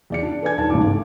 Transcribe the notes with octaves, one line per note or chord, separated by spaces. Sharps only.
E2 D5 C#7
D4
A4 B4 D5 G#5 G#6
D#1 D#2 A5
G#1 G2 C#3 E3 D4 D6
A3